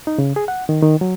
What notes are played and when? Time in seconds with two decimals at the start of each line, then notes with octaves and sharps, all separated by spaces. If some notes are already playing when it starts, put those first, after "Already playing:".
0.07 D#4
0.18 C#3
0.36 G#4
0.48 F#5
0.69 D#3
0.82 D#3
1.01 F#3